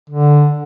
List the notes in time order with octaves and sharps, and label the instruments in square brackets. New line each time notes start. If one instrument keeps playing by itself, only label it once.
[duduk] D3